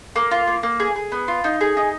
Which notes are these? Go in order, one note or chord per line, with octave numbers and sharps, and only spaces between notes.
A#3
F4
A#3
A#3
G#4
G#4
B3
F4
D#4
G#4
D#4